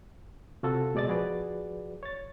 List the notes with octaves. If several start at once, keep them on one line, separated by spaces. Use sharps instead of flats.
C3 F4 F#4 A4
B2 G#3 D5 D#5 A6
F3 F#4 G#4 B4 D5
C#5 A6